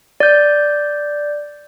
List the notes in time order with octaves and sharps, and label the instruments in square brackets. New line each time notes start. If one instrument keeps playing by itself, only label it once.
[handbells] D5 G6